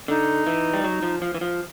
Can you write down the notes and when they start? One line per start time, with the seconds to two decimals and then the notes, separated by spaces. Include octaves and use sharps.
0.08 D3 D#4
0.47 E3
0.74 G3
0.84 F#3
1.03 F3
1.22 F3
1.34 E3
1.41 F3